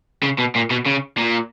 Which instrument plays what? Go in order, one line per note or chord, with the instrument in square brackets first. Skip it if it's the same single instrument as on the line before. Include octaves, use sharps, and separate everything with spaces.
[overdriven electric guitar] C#3
B2
A#2
B2
C#3
A#2